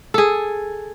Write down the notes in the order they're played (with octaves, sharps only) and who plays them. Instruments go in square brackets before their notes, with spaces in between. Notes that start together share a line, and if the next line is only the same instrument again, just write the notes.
[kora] G#4 A4